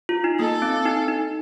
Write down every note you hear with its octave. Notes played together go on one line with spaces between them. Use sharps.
F4
D#4
A#3 A4
C4
D#4
D#4